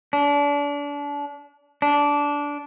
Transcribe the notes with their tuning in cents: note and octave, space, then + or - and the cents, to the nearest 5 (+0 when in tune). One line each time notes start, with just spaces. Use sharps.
D4 -30
D4 -15